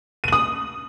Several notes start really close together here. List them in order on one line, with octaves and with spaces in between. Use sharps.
D#7 F#7 D#6